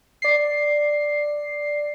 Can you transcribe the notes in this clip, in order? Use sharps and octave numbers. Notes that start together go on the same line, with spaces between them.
D5 C7